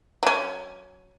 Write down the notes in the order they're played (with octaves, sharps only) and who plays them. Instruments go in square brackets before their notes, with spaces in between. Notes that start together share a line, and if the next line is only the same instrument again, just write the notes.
[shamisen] F#3 C#4